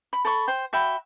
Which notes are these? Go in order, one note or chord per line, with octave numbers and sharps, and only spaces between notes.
B5
A4 B5 C#6
C5 G5
F#4 E5 G5 B5